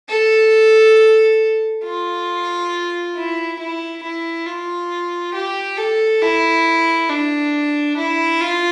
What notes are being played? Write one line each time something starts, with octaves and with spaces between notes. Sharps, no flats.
A4
F4
E4
E4
E4
F4
G4
A4
E4
D4
E4
F4